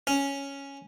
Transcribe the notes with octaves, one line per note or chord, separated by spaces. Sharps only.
C#4